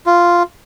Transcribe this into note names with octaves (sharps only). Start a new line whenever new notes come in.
F4